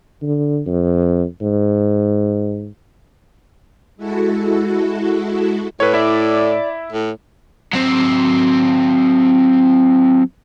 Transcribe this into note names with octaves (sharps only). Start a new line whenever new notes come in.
D3
F2
G#2
G#3 E4 F#4 A4
A2 B4 C#5
E4 D5 E5
A2
F#3 C4